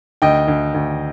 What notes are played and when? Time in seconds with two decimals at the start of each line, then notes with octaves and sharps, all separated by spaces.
0.22 D2 D#5 G5
0.48 D2
0.74 D2